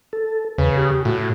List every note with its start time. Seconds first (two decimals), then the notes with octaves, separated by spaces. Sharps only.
0.13 A4
0.58 E2 C#3 B4
0.77 G4
1.05 A2 F#4